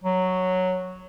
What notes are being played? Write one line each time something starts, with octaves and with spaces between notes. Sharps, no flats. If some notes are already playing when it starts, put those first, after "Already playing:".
F#3